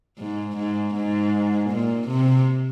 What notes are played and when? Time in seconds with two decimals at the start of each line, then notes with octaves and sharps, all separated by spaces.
0.19 G#2
0.57 G#2
0.95 G#2
1.70 A#2
2.08 C3